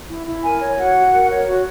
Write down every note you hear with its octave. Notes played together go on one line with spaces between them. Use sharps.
E4
E4
A#4 G#5
C#5
F#4 F#5
F#4
A#4
C#5
F#4